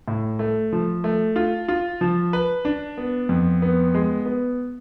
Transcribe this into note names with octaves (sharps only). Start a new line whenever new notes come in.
A2
A3
F3
A3
F4
F4
F3
B4
D4
B3
F2
B3
G#3
B3